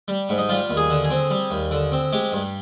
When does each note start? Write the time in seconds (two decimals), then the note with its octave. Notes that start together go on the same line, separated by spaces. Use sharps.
0.08 G3
0.29 G#2
0.38 D#4
0.49 G3 F4
0.70 D#2
0.77 G#4
0.90 D3
1.04 G#4
1.10 C4
1.30 G3
1.51 D#2
1.71 D3
1.92 C4
2.13 G#3 G4
2.32 G2